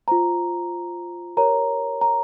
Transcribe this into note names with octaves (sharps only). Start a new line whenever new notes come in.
F4 C5 A#5
G4 A#4 C#5 A#5
A#5